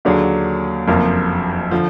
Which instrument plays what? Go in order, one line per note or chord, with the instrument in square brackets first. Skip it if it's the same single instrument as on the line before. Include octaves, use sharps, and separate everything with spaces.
[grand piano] D#2 D3 F#3 D4 G#4
F#1 F2 F3 A#3 F4
D3 F3